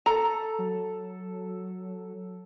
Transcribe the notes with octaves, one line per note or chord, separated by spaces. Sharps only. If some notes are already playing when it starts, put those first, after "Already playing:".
A4 A#5
F#3